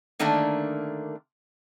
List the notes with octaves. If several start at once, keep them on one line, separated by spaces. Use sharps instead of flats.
D3 D#3 A3 A#3 D4